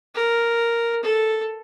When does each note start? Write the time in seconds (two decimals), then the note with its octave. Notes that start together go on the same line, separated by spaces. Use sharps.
0.15 A#4
1.02 A4